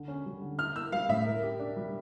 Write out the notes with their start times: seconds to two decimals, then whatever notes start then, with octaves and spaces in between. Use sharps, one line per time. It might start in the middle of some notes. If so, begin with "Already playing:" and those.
Already playing: D3
0.08 C#4
0.26 G3
0.42 D3
0.59 E4 F6
0.75 A#3 E6
0.92 G3 F5
1.09 A2 E5
1.26 A#4
1.43 G4
1.59 D4
1.76 G3